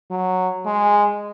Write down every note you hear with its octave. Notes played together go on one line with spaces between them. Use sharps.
F#3
G#3